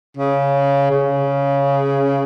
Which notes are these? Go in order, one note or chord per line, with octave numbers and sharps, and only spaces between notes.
C#3
C#3